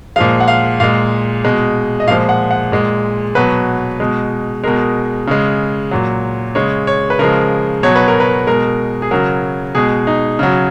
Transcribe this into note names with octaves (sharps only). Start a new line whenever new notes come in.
A#2 F3 G#3 F5
F#5
F5
A#2 G#3 F5
B2 G#3
D#5
A#2 F3 G#3 F5
F#5
F#5
A#2 G#3
B2 F#3 B4
B2 G#3
B2 G#3 A#4
C#3 G#3
A#2 F#3
C#3 G#3 C#5
C#5
B4
C#3 F3 G#3 A#4
B2 F#3 C#5
B4
A#4
B4
B2 G#3 A#4
G#4
C#3 F#3 A#4
B2 G#3 G#4
D#4
C#3 F#3